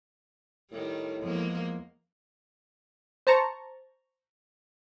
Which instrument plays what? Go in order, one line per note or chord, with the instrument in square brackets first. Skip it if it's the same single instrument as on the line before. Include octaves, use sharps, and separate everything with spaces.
[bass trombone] A2 [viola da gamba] D#3 G3
[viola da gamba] E2 G#3 A#3 [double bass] F3
[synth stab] C5 A5 A#5 C#6